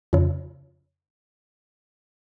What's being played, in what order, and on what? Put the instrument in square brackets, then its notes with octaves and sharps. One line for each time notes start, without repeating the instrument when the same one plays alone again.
[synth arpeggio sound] F2 C#3